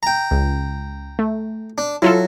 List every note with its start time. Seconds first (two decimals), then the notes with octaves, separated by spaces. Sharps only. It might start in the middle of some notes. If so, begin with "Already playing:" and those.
0.03 G5 A#5
0.31 C#2
1.19 A3
1.78 D4
2.02 F#3 E4 F4 A4